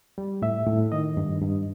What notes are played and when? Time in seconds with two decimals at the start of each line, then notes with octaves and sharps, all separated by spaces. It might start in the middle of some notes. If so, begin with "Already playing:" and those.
0.18 G3
0.42 A2 E5
0.67 A2
0.92 D#3 D#5
1.17 G2
1.42 G2